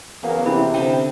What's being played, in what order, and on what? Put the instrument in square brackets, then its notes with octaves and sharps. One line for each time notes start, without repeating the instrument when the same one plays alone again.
[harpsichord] E2 [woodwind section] C#3 F#3 A#3
[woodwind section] C3 [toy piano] C#4 E4 B5
[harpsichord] D3 C4 D#6 [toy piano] G5